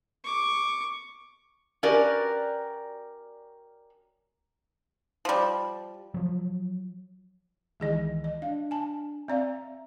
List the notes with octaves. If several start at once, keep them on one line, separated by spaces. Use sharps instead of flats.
C#6 D6
C#4 F#4 G4 A#4 B4 D5
F3 G3
F3 F#3
C#2 D#3 E3 G#3 G#4 D#5
D#5
D4 F5
G#5 A5
C4 D5 E5 F5 A#5